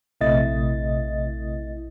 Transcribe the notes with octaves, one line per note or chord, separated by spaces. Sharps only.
A#1 C3 A3 E4 D#5 A6